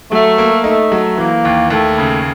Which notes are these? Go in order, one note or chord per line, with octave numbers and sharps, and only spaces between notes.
F#3 A3
A#3
A3 D#4
F#3
E3 A#3
D#2
D#2 A3
C#3